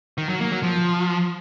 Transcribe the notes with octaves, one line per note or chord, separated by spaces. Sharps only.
D#3
F#3
A#3
F#3
F3